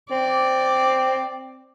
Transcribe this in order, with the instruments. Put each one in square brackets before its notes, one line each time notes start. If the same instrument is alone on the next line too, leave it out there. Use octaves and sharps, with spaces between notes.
[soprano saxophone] C4 [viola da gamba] D5